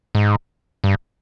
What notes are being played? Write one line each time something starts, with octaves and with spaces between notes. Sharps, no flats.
G#2
G2